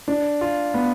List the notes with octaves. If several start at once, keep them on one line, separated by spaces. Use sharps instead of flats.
D4
F4
B3